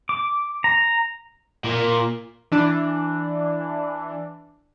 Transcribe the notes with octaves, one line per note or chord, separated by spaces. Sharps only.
D6
A#5
A#2
E3 D4